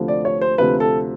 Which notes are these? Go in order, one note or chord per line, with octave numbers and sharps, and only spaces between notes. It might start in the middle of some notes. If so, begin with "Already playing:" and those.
Already playing: D2 C3 F3
D5
C#5
C5
D2 C3 F3 B4
A4